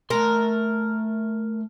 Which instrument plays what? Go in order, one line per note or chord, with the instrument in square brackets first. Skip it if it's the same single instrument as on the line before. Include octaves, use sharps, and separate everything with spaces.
[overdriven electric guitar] A3 C6 [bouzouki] A#4